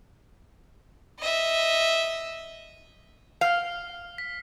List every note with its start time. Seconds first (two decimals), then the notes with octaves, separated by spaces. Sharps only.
1.20 D#5 E5
3.41 F5 F6 C7
4.18 B6